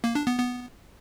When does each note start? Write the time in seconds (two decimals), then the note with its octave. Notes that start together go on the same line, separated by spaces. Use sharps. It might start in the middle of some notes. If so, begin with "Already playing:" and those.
0.04 A#3
0.15 D4
0.27 B3
0.38 B3